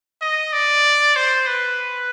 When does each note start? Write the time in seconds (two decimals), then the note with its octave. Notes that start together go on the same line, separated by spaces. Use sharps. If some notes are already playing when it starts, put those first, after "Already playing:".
0.22 D#5
0.53 D5
1.16 C5
1.47 B4